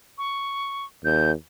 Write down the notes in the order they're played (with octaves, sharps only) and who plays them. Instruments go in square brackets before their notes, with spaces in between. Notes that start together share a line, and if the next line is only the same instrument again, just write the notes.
[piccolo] C#6
[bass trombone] D#2 [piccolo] G6